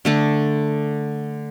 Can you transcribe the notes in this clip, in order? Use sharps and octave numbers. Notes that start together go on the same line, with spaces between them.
D3 A3 D4